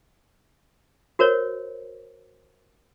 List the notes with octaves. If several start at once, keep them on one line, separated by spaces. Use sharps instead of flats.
F#4 A#4 C5 C#5